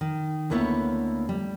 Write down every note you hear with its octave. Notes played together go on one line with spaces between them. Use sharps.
D#3
D2 A#3 B3 E4 C#5
G3